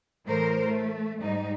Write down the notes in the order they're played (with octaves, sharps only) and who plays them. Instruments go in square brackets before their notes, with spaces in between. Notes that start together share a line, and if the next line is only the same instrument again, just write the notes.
[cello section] A2 E3 A3 A#4 C5
A3
G#2 G3 D#4